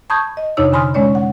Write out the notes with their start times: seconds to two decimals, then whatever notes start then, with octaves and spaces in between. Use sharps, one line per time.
0.10 A5 B5 C#6 D#6 G6 G#6
0.37 D#5
0.57 F2 C3 D4 D#4 C#5 E6
0.72 D3 G#5 B5 C6 D#6 F6
0.94 G#3 C#4 C#5 D5
1.15 F#5